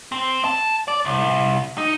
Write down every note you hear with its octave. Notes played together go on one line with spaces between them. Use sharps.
C4
A5
D5
C2
D#4